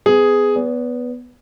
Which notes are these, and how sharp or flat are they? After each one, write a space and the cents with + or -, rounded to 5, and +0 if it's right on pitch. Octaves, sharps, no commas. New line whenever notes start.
B3 +30 G#4 +0
B3 +0 D5 -45